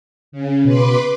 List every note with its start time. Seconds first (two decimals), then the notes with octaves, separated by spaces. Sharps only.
0.32 C#3
0.65 B2 B4 C6 D6